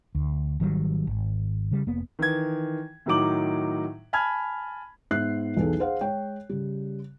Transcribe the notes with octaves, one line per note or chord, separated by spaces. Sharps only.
D2
G#1 D#3 F#3 G3
G#1
C#3 G3
F1 A#3 B3
D#3 E3 G#6
A2 D#3 F#3 D#4 D6 F#7
G#5 A5 B5 F6 G#6
G#2 B3 E5 F#6 C7
B1 E2 E3 B3 G#4 A4
G#4 C5 F5 F#5
G#3 C#5 G5
C#3 G3